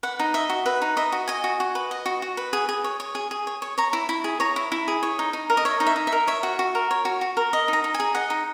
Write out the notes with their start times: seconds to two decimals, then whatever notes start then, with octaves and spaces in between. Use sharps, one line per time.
0.03 B4 F#5
0.19 D#4
0.34 D#5 E5
0.50 F#4
0.66 B4 E5
0.82 D#4
0.97 D#5 E5
1.12 F#4
1.28 D#5 G#5
1.44 F#4
1.60 F#4
1.75 B4
1.91 D#5
2.06 F#4
2.22 F#4
2.37 B4
2.53 G#4
2.69 G#4
2.84 C#5
3.00 C#5
3.15 G#4
3.31 G#4
3.47 C#5
3.62 C#5
3.78 C#5 A#5
3.93 E4
4.09 E4 B5
4.24 G#4
4.40 C#5 A#5
4.56 E4
4.72 E4
4.88 G#4
5.03 C#5
5.19 D#4
5.33 D#4
5.50 A#4
5.57 D#5
5.65 C#5 E5
5.80 D#4
5.86 E5
5.96 D#4
6.07 E5
6.12 A#4
6.27 C#5 E5
6.43 F#4
6.59 F#4
6.75 A#4
6.91 C#5
7.05 F#4
7.21 F#4
7.37 A#4
7.53 D#5
7.68 D#4
7.73 A#5
7.84 D#4
7.94 G#5
8.00 G#4
8.15 D#5 F#5
8.30 D#4